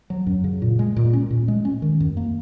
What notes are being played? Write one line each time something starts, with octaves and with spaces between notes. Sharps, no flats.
F#3
F#2
C#3
A#2
G#3
A#2
C#4
A#2
G#3
C#4
D#3
F#2
A#3